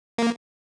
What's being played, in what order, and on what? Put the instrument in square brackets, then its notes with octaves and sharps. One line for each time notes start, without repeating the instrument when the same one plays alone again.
[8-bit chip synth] A#3